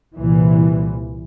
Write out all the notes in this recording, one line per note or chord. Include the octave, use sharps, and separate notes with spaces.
C2 A#2 E3